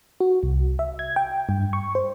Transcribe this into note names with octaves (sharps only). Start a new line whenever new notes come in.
F#4
C2
E5
G#6
G5
G2
C#6
C5